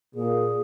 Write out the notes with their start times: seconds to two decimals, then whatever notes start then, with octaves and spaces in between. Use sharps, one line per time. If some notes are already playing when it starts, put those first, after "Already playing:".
0.14 A#2 G#4